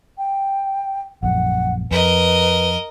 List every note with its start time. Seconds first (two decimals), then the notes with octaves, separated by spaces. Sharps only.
0.18 G5
1.23 A#1 F#2 F#5
1.91 F2 A#4 B4 D#5